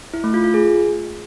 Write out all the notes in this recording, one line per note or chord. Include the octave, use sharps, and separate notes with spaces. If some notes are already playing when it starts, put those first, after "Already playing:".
E4
A3
F4
F4
G#4